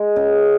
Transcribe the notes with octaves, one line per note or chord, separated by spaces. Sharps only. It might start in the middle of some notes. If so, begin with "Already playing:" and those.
Already playing: G#3
C#3